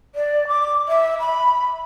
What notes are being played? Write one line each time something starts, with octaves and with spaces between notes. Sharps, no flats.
D5
D6
E5
B5